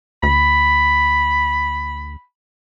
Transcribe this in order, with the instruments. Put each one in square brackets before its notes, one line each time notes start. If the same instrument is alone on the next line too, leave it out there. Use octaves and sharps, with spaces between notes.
[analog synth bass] D2 [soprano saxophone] B5